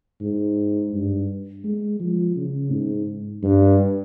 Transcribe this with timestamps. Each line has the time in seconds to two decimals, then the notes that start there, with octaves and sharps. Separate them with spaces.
0.21 G#2
0.93 G2
1.64 G#3
2.00 F3
2.36 C#3
2.72 G#2
3.43 G2